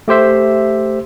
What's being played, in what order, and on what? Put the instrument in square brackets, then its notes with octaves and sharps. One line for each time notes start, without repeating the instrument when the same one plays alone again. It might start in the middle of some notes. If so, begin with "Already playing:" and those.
[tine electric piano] A3 G4 C5 E5